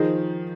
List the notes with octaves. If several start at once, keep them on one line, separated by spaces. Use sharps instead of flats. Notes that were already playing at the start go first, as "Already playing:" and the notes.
Already playing: D#3 F3 G#4 C5 D#5